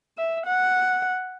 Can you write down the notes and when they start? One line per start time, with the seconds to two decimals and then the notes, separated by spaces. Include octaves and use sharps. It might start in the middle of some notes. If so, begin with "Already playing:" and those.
0.18 E5
0.46 F#5